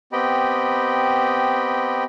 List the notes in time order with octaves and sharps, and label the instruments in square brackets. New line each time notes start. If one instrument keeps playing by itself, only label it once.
[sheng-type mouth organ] B3 C4 G4 D#5 G5 B5